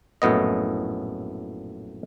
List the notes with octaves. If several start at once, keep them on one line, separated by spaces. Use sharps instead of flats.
A#1 F#2 A2 B3 D#5